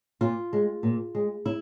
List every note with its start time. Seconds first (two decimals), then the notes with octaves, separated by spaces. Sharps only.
0.21 A#2 F4
0.53 G#3
0.83 A#2
1.15 G#3
1.46 E4